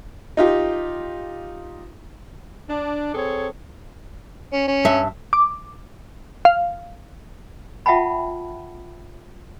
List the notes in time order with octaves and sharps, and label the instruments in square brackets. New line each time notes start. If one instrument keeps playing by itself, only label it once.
[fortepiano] D#4 F4 G4
[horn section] D4
C4 G#4 A4 C#5
[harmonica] C#4
C#4
[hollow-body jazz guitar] G2 E5
[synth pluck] D6
F5
[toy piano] F4 E5 F#5 G5 A5 B5